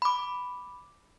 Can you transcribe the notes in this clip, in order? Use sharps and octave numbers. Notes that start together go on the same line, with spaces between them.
B5 D6